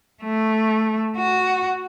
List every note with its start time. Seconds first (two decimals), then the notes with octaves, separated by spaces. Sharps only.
0.24 A3
1.18 F#4